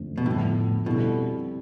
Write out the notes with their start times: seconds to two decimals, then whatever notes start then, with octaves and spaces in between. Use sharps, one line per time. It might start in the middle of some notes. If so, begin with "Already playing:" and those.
Already playing: F2 D3 A3
0.18 B2
0.26 A2 D3 F3 B3
0.86 B2 G3 C4 E4 A4